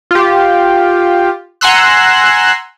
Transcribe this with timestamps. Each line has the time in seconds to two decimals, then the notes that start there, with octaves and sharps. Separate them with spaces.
0.11 F4 G4
1.61 F#5 G#5 A#5 C6 E6 F#6